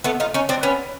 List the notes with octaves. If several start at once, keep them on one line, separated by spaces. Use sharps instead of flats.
A3 B3
D#4 F4
C#4 D#4
C4 D4
B3 C#4